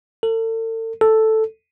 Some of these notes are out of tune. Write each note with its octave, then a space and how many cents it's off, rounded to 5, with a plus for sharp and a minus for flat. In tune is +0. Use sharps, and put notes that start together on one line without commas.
A4 +40
A4 +0